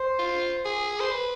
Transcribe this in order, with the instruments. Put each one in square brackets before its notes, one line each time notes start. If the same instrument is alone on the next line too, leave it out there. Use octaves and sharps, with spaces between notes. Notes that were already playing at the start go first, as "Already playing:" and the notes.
Already playing: [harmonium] C5
[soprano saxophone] F4
G#4
C5
B4